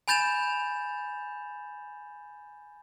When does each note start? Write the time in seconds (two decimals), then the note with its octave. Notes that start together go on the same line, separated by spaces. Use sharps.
0.08 G#5 B5 G6 A6 E7 F7